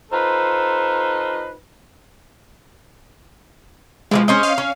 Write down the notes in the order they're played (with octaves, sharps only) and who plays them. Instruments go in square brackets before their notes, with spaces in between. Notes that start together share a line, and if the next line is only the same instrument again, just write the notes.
[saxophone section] D#4 F4 A4 B4 C5
[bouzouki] B2 E3 F3 [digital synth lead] G#3
[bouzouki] C#4 C5 D#5
[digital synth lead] F5
[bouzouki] C#4